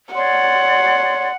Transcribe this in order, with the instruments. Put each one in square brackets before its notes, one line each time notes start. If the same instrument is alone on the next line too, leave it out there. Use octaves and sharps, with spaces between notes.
[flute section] C#5 D5 C6 [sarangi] F#5